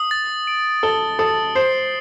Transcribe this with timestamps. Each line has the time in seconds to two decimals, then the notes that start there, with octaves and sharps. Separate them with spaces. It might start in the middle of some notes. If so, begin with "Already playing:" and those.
Already playing: D#6
0.11 A6
0.47 D7
0.83 A4 G7
1.19 A4 D#6
1.55 C5 C7